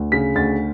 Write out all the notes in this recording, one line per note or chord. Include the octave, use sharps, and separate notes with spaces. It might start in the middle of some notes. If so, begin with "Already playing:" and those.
Already playing: D2
C#3 B6
D2 A6